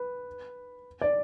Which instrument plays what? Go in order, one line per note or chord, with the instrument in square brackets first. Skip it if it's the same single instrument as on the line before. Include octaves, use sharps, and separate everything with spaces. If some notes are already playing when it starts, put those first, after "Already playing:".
Already playing: [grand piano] B4
D5